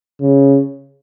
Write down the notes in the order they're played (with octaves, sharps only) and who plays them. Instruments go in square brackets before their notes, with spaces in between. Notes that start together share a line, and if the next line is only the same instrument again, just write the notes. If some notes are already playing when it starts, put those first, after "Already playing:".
[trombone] C#3